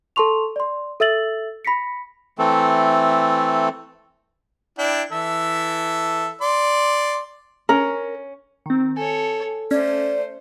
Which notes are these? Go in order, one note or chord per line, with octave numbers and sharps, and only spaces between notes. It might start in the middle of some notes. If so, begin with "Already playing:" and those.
A4 A5 C6 C#6 F7
D5 C6
A4 E5 E6 A6 F#7
B5 A#6 B6 C#7
E3 A3 C4 A4
D4 E4 G5
E3 A4 E5
D5 C6
C#4 A#4
D#3 C4
A4 C#5 G#5
A3 C#4 C5 D5